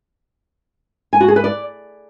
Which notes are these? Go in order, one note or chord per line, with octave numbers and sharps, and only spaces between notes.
G#5
F#4
G#4
B4
D5